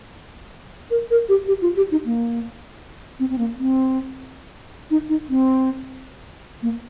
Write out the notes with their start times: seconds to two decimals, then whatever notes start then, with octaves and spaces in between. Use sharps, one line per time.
0.91 A#4
1.11 A#4
1.29 G4
1.48 G4
1.62 F4
1.77 G4
1.91 D#4
2.06 A#3
3.20 C4
3.30 C4
3.38 A#3
3.58 C4
4.91 D#4
5.09 D#4
5.29 C4
6.62 A#3